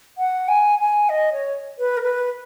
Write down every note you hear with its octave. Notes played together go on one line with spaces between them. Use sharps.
F#5
G#5
G#5
D#5
C#5
B4
A#4
B4